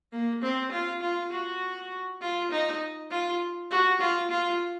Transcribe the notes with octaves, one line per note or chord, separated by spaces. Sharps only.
A#3
C4
F4
F4
F#4
F4
D#4
F4
F#4
F4
F4